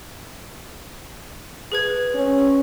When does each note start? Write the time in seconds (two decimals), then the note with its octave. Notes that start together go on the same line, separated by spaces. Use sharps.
1.72 G#4 B4 G#6
2.15 C#4